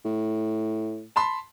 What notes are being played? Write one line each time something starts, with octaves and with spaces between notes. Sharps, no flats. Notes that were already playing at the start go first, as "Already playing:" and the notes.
A2
A5 B5 C6